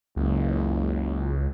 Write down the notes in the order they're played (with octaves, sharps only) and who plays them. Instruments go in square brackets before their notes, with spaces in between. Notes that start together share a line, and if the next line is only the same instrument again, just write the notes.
[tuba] F#1 [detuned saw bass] C#2